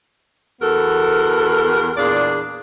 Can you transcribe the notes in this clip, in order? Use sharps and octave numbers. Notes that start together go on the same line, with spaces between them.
E2 B3 F#4 A4 A#4
E2 A#2 D4 G#4 D5